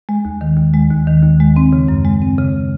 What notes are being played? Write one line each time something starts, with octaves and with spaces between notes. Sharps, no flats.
G#3
D#2
D#3
D#2
G#3
D#2
D#3
D#2
G#3
C4
C#3
F#2
G#3
C4
C#3